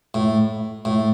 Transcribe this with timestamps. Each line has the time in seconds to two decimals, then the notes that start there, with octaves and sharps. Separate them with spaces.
0.14 A2
0.85 A2